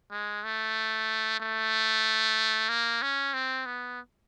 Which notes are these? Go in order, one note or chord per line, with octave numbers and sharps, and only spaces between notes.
G#3
A3
A3
A#3
C#4
C4
B3